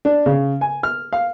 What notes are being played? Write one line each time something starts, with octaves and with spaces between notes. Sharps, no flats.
D4
C#3
G#5
F6
F5